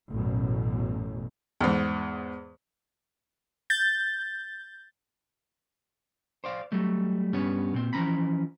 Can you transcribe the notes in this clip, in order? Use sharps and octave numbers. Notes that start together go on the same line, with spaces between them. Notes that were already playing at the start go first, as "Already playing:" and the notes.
A1 F#2 B2
E2 G#2
G6 A6
C5 D5 F5
F#3 G3 A3
G2 G3 B3 C#4 C#5
A#2 C4
E3 F3 C#4 A#5 B5